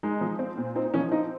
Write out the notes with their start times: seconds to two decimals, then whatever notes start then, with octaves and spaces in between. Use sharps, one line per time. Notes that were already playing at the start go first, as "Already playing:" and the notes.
0.03 G#3 D#4
0.21 F3
0.39 C4
0.57 A#2
0.76 C4 D#4
0.94 F3 C#4
1.12 C4 D#4